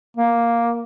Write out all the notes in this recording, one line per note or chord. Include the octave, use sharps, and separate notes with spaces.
A#3